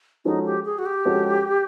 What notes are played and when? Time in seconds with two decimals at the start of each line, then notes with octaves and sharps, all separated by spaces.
0.25 F3 G#3 C#4 D#4 F#4 A4
0.46 G4
0.65 G#4
0.78 F#4
0.86 G4
1.05 F3 G#3 C#4 F#4 A4